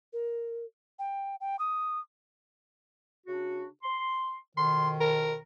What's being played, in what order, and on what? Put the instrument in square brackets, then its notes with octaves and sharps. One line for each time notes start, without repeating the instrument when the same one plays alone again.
[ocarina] A#4
G5
G5
D#6
[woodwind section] C#3 D4 F#4
C6
[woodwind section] F2 B2 D#3 [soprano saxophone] C6
[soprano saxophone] A#4